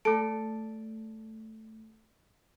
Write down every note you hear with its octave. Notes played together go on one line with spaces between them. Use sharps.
A3 A4 D7